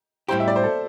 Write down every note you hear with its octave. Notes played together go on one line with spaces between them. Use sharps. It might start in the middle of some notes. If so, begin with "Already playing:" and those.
A2 G3 E4 G4 C5
E5
D5
C5
A4